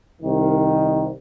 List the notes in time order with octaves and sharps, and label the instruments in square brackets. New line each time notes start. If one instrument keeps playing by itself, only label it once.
[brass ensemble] C2 D#3